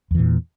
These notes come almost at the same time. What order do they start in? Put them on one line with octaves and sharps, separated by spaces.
E2 E3 A#2